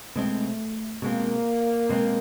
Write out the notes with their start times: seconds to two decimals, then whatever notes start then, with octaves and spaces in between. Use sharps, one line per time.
0.15 B2 G#3 A3 C4
1.02 B2 G#3 A#3 C4
1.89 B2 G#3 C4